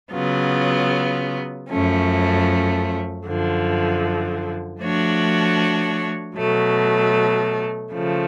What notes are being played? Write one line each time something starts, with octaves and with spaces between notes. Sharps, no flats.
C#3 F#3 B3 F4
F#2 F3 A3 C#4
F#2 D3 F3
F3 A3 D4 F#4 C#5
B2 F#3 A3
C#3 F3 A3